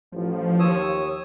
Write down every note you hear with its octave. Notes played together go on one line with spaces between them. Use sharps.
A1 F3
D#2 C#5 D#6 E6